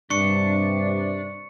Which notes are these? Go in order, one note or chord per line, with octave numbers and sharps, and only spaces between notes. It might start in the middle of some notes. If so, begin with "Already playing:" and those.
G2 C3 D4 C#6 C#7